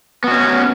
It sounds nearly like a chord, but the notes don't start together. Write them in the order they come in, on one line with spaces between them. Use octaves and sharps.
B3 F#4 C#4